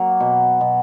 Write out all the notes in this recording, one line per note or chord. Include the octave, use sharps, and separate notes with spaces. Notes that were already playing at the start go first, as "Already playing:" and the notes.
Already playing: F#3 A#3
B2
B2